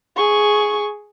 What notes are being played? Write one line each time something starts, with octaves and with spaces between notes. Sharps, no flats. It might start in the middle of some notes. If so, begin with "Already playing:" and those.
G#4 C#6